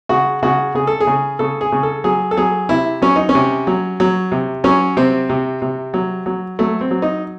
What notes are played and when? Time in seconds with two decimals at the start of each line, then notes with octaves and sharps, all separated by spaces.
0.09 C#3 F#4
0.43 C#3 F#4
0.75 C#3 G#4
0.87 A4
1.00 G#4
1.07 C#3
1.39 C#3 A4
1.61 G#4
1.72 C#3
1.83 A4
2.04 F#3 G#4
2.31 A4
2.37 F#3 G#4
2.69 C3 E4
3.02 F#3 C#4
3.16 D#4
3.29 C#4
3.35 C3
3.67 F#3
4.00 F#3
4.32 C3
4.64 F#3 C#4
4.97 C3 C4
5.29 C3
5.62 C3
5.94 F#3
6.26 F#3
6.59 F#3 A3
6.81 C4
6.91 F#3
7.02 D#4